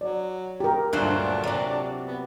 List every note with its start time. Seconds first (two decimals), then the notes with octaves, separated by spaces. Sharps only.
0.01 F#3 D5
0.60 G4 A#4
0.93 D2 G2 A#2 F#3 D4 C5 F#6
1.44 C3 F#3 D5
2.07 B3